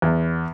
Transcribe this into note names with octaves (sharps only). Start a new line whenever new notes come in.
E2